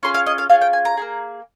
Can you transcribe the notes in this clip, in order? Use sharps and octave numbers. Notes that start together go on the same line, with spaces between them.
C#4 F4 G#4 C6
F5
D#5
F5
C#4 F4 G#4 F5
G5
G#5
A#5
A#3 D#4 G#4